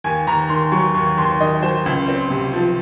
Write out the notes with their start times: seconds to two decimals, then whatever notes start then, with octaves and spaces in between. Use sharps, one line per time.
0.04 D#2 G#5
0.27 D#2 A#5
0.49 D#3 C6
0.72 F#3 C#6
0.95 D#2 C#6
1.18 D#2 C6
1.40 D#3 D#5
1.62 F#3 C5
1.86 C#2
2.08 C4
2.30 C3
2.54 F3